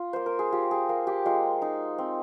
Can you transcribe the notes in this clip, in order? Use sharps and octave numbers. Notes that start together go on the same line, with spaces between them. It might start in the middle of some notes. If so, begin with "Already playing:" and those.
Already playing: F4
A#3 C5
A#4
G#4
F4 G4
G#4
A#3
G4
G#3 F4
D#4
C4